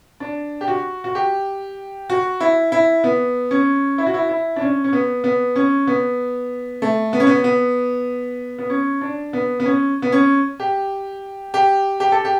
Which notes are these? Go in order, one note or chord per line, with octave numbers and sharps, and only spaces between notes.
D4
G4
F#4
F#4
G4
F#4
E4
E4
B3
C#4
E4
F#4
E4
E4
D4
C#4
C#4
B3
B3
C#4
B3
A3
B3
C#4
B3
B3
B3
C#4
D4
B3
B3
C#4
B3
C#4
G4
G4
G4
A4
G4